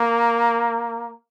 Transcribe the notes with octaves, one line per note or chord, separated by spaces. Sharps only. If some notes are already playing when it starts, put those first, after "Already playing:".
Already playing: A#3